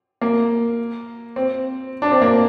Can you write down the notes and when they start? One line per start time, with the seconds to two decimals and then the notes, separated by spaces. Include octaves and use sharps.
0.22 A#3
1.36 C4
2.02 D4
2.12 C4
2.22 A#3